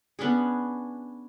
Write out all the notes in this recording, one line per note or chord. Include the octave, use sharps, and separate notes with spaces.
B3 C#4 D4 G#4